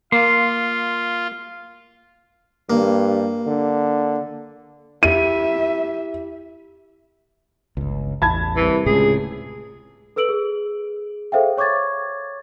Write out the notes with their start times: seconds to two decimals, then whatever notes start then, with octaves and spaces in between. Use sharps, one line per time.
0.12 A#3 F4 C6
2.70 G2 A#3
3.47 D3
5.03 E4 G4 E5 D#7
7.77 G1 C#2
8.22 A1 E2 A5 B5 G#6
8.56 C2 E3
8.86 D1 C#2 A2 C3 G#4
10.16 A4 B4 E6 D7 F#7
10.29 G#4
11.32 G#4 A4 C5 E5 F5 G5
11.57 C#5 C#6 D6 G#6 A6